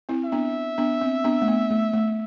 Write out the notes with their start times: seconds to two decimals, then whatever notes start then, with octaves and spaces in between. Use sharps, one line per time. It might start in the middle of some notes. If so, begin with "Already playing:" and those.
0.09 C4 E4
0.25 E5
0.32 B3 D4
0.78 B3 D4
1.01 C4
1.24 B3 D4
1.42 A3
1.48 B3
1.70 A3
1.93 A3